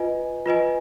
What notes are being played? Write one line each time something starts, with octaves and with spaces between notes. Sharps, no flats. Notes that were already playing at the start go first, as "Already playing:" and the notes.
Already playing: F4 B4 D#5 G#5
F4 B4 D#5 G#5